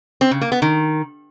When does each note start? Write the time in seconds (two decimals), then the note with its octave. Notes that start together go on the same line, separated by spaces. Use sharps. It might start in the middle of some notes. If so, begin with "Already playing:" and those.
0.21 C4
0.31 C#3
0.41 A#3
0.52 B3
0.62 D#3